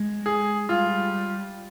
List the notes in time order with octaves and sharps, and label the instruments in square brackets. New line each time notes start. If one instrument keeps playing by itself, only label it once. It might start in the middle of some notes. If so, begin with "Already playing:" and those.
Already playing: [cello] G#3
[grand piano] G#4
[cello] G3 [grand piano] F4